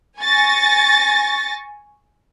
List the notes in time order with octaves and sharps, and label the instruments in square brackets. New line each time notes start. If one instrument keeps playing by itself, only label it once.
[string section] G#5 C#6 A6 A#6